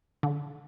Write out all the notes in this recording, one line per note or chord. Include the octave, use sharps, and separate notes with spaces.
D3